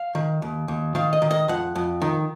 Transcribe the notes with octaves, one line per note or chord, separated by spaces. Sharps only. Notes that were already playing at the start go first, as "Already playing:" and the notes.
Already playing: F5
D#3
D#2
D#2
D#3 F5
D#5
D#3
D#5
F2 F#5
F2
D#3